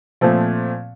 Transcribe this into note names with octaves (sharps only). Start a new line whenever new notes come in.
A#2 F3 A3 C4